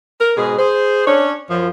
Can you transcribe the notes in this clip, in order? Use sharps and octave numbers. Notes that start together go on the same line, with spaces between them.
A#4
G#2 B2 G#4
G#4 C5
C#4 D4 C#5
F#2 F3